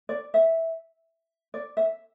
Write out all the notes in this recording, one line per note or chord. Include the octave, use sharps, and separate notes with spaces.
D5
E5
D5
E5